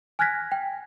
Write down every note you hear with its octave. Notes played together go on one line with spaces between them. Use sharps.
G#5 F6 F#6 G#6 A#6 B6
G5